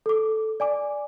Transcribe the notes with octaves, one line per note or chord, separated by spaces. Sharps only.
A4 D6
D5 G#5 D6